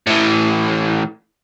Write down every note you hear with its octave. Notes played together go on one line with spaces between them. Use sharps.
A2 E3